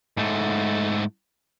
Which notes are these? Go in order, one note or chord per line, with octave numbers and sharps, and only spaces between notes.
G#2 A3